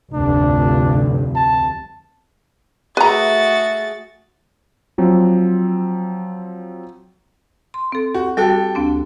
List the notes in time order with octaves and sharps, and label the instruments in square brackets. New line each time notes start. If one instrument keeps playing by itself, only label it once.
[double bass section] F1 D2 G2 [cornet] D4
[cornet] A5
[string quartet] A3 F#4 A6 [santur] G#4 E5 [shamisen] B4 A#5
[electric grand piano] F3 F#3 C4
[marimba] C6
C4 A4
[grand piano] F#4 [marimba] G4
[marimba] G3 F#4 [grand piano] G4 A4 G5
[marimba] D2 C4 D4